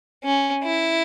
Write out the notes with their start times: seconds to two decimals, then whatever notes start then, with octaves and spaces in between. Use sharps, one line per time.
0.24 C#4
0.64 E4